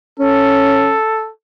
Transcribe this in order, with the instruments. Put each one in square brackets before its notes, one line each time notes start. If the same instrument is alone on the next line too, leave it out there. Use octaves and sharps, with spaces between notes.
[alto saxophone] C#4 [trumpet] A4